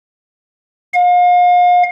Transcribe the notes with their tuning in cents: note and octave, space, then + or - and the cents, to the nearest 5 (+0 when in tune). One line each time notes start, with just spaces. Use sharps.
F5 +35